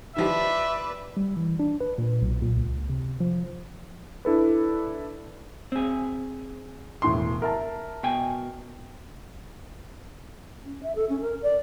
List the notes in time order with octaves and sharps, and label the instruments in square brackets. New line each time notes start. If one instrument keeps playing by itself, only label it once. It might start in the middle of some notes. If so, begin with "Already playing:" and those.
[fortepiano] D#3 F3 G4 [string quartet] B4 D5 [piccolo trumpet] E5
[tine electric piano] G3
E3
D4
B4
A#2
B1
A#2
C#2
C3
F3
[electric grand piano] D4 E4 A4 B4
[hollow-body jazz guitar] C4 G#4
[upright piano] E1 A2 C6
A#4 E5 A5
[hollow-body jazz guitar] B2 G5 G#5
[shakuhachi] C#4
E5
A4
C#4
A#4
D5